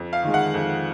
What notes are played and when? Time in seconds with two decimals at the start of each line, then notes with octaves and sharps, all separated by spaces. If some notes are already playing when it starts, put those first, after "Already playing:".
Already playing: F2
0.13 F5
0.23 D#3 G#3
0.34 F#5
0.54 F2